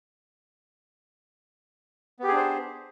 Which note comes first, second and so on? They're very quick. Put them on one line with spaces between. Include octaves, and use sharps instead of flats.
B3 G4 G#4 D4 C5